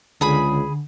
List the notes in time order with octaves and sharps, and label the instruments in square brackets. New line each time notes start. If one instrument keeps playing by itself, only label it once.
[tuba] C#2 [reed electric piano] D3 [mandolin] G#4 B5